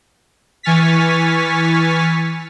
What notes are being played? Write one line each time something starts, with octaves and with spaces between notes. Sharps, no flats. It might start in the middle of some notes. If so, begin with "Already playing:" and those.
E3 G#5 C#6 F6 A6 B6